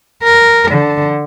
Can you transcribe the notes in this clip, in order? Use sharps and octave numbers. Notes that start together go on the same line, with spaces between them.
A#4
D3